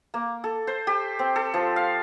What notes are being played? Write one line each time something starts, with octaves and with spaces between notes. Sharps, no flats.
A#3
A4
C5
G4
C4
A4
F3
F5